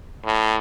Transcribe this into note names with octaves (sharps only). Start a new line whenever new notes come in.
A2